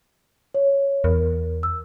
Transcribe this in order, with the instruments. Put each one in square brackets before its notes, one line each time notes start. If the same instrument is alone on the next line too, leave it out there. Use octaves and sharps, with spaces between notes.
[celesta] C#5
[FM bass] E2 [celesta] A#4
[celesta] E6